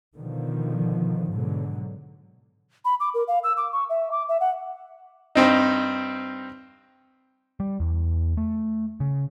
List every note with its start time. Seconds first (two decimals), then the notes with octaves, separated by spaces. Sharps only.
0.15 B2 D3 D#3 F3
1.31 G#2 B2 D3 F#3
2.85 B5
3.00 D6
3.14 A#4
3.28 F5
3.44 E6
3.57 D6
3.73 C#6
3.90 E5
4.12 D6
4.29 E5
4.40 F#5
5.35 G2 C4 D#4
7.60 G3
7.80 E2
8.37 A3
9.00 C#3